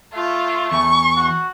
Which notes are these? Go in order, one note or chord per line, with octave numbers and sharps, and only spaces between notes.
A3 F4
E2 C#6
F#4